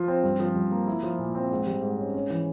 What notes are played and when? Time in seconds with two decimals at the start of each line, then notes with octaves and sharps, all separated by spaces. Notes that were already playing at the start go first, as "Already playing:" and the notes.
Already playing: F3 F4
0.08 C4
0.24 G2
0.40 F3
0.56 G2
0.72 A#3
0.87 E4
1.03 F3
1.19 A#2
1.35 C4
1.51 G#2
1.67 G3
1.83 G#2
1.98 C#4
2.14 C#4
2.30 E3